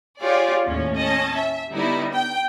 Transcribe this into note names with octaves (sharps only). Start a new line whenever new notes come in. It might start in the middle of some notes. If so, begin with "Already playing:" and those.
F4 G4 G#4 C#5 D5
D#2 A2 C#4
C#4 D#5 A5
E5
D3 G3 B3 D#4 E4
G5